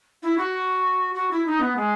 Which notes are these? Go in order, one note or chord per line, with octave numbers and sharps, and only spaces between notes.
E4
F#4
F#4
E4
D#4
B3
G#3